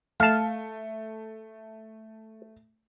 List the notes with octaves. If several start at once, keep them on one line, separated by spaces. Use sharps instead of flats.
A3 F5 A5